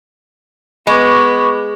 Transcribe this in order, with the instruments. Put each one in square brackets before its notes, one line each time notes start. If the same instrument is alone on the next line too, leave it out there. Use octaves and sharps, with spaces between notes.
[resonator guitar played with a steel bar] G#3 [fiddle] B3 [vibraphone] B5 C#6 D6